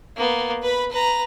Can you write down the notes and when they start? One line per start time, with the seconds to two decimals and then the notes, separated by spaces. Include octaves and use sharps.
0.17 A#3 B3
0.62 B4 B5
0.91 B4 A#5